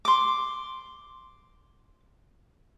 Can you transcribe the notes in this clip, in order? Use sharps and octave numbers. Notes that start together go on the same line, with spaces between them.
C6 D6